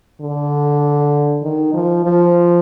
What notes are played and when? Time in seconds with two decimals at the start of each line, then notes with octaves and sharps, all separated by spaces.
0.21 D3
1.42 D#3
1.73 F3
2.04 F3